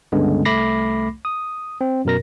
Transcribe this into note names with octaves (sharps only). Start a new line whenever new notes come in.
C#2 G2 D3 G#3 B3 C#4
C2 A3 B5 D6 A#6 C7
D#6
C4
F#2 B2 A#4 A#6